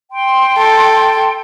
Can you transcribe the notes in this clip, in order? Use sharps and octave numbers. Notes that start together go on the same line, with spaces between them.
G5 C6
A4